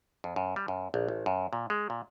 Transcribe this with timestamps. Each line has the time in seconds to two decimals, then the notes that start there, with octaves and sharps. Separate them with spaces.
0.24 F2
0.36 F#2
0.56 G3
0.68 F#2
0.94 A#1
1.08 A1
1.26 F#2
1.53 A#2
1.70 G#3
1.90 A#2